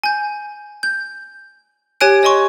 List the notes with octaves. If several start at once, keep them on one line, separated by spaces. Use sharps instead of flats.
G#5 G6
G6
G4 C#5 G#5 F#6 D7
C#5 D#5 G#5 C6 C#6